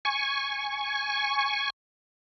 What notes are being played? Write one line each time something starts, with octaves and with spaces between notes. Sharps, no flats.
G#5 C#6